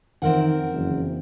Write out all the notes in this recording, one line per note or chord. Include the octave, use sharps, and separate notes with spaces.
F2 D#3 E3 C4 A#4 F#5
F#1